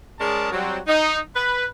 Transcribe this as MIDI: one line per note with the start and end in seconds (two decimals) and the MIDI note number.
0.19 0.50 56
0.19 0.50 61
0.19 0.50 68
0.19 0.50 70
0.19 0.50 74
0.19 0.50 81
0.52 0.78 54
0.52 0.78 55
0.52 0.78 60
0.87 1.18 63
1.35 1.64 71